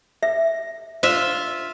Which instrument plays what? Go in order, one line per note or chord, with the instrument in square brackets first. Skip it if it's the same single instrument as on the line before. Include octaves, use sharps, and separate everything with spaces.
[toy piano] E5
[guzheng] F4 E5 [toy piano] C5